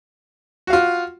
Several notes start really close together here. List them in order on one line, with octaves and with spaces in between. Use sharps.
F#4 F5 F4